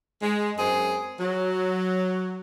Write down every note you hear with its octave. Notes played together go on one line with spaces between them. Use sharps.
G#3
F#2 C4 G#4
F#3